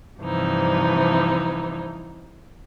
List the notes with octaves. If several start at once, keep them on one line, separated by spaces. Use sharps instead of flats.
G2 C3 E3 F3 D#4